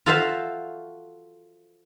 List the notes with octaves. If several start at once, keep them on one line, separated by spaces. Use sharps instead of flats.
F4 F#4 A4 C5 E5 F5